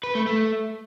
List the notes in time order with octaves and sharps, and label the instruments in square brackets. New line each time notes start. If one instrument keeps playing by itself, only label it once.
[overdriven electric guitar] B4
A3
A3